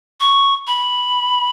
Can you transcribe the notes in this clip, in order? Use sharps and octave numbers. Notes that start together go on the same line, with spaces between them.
C#6
B5